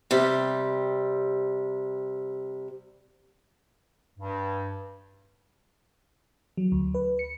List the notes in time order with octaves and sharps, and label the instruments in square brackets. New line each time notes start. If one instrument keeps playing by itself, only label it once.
[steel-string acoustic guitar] C3 G3
[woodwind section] G2
[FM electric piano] F#3
D2
B4
C#7